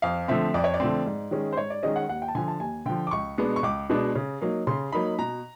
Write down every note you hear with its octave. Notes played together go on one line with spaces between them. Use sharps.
F2 F5
D3 F3 A3 C4 E5
F2 D5
C#5
D5
D3 F3 A3 C4
G#2
D#3 G#3 C#4
C5
G#2 C#5
D5
D#3 G#3 C#4 D#5
F#5
D#2 F#5
G5
A5
D3 F3 G#5
A5
D#2 G#5
D3 F3 G5
D6
C#2 C#6
B2 G#3 B3 D4
C#6
C#2 D6
B2 G#3 B3 D4
C#3
F#3 A#3 D#4
C#3 C6
F#3 A#3 D#4 B5
B2 A#5